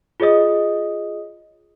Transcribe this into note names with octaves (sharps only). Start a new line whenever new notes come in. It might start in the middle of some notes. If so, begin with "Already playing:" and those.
F4 G#4 C#5 D#5 D#6